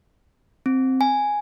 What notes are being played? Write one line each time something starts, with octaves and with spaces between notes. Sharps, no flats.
C4
G#5